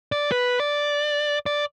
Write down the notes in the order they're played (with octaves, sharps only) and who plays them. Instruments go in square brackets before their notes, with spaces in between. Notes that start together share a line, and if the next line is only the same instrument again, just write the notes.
[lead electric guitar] D5
B4
D5
D5